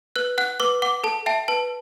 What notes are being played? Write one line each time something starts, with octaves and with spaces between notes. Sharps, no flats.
B4 F#6
F#5 F#6
B4 D6
F#5 D6
A4 A5
E5 G5 A5
B4 A5